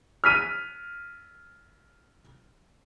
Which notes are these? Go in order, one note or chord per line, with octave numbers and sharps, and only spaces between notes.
F6 B6 D#7